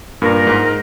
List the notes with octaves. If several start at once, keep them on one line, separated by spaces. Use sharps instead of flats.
G2 A#2 A#4
G#2